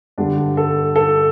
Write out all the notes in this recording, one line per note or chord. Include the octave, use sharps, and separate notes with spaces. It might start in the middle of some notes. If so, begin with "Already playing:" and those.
G2 D3 G3 D4
A4
A4